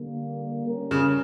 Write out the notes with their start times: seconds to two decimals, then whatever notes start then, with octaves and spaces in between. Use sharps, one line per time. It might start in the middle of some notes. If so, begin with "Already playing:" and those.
Already playing: D3 G3 A#3
0.65 G3 C#4 G4 A#4
0.91 C#3